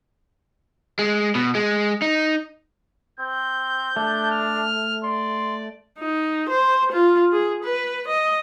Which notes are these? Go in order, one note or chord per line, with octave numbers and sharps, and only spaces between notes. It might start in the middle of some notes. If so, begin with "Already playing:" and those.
G#3
B2
G#3
D#4
C4 G6
A3 D4
F6
D5 C6
D#4
C5
F4
G#4
B4
D#5